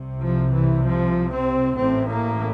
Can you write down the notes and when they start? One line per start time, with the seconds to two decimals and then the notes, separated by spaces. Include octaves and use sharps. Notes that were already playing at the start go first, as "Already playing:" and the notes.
Already playing: C2 C3
0.22 F3
0.53 E3
0.84 F3
1.31 C4
1.78 A1 A2 C4
2.09 A#3